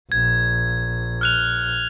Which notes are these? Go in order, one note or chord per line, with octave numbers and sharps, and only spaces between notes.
A#1 G#6
F6 F#6 F7